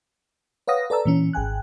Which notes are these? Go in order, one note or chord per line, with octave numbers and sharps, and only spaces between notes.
B4 C#5 F5 F#5 D#6 A#6
A4 B4 D5 A5 A#5 E6
A#2 E3 C#4
G#1 G5 G#5 F#6